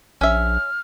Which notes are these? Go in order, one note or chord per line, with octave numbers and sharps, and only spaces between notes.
A#1 C#4 E5 F6